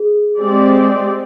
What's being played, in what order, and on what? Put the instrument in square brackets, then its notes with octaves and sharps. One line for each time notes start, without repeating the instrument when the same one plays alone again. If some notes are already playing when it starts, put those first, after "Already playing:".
Already playing: [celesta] G#4
[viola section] G#3 C4 G4 D5